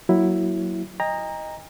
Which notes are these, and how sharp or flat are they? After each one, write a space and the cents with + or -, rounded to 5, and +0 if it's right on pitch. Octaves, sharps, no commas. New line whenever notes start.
F#3 +0 A#3 +0 E4 +0
D#5 +0 G5 +45 A#5 +0